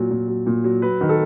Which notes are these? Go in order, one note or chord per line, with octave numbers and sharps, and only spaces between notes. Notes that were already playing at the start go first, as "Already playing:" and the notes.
Already playing: A#2 F#3
A#2
F#3
A#2
F#3
F#3 B4
D#3
A4